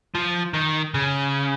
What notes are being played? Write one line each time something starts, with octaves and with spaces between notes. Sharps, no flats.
F3
D#3
C#3